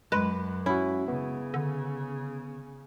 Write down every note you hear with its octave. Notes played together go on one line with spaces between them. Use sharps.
F#2 G#3 B4 F#6
C#4 E4 F#4
C#3 B3
D3